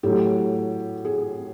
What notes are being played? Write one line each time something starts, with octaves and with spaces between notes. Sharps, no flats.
A2 F#3 G4
G#4